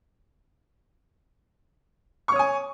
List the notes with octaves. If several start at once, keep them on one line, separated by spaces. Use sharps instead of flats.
C#5 G#5 C#6 D#6